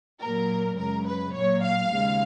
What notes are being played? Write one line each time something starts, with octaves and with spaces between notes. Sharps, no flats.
A#2 F#3 A#3 A#4
F#2 C#3 G#3 A#4
B4
A#2 F#3 A#3 C#5
F5
D#2 C#3 G#3